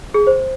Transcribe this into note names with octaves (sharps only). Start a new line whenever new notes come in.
G#4
C5